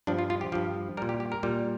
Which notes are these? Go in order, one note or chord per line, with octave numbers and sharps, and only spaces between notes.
G2 F3 D4
F4
F4
G4
G2 F3 G4
A#2 G3 A#4
G4
G4
A#4
A#2 G3